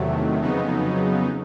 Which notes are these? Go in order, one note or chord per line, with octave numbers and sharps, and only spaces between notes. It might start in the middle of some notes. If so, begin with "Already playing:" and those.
Already playing: E2 C3 D#3 F#3 A3
F2 C#3 F#3 B3 D#4